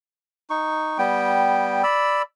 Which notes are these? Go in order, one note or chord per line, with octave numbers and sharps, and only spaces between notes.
D#4 C#6
G3 B3 G5
D5 B5 E6